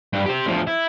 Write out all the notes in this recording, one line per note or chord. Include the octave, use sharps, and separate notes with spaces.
G2 G3
G4 C5
D2 F3
E4